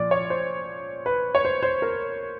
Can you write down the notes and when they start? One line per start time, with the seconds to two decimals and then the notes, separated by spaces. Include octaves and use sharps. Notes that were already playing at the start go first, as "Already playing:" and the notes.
Already playing: A#2 F3 D5
0.11 C#5
0.30 C5
1.06 B4
1.35 C#5
1.45 C5
1.63 C5
1.82 A#4